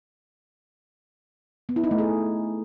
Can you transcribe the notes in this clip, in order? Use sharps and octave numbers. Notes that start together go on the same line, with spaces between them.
B3
E4
D#4
A3
G#4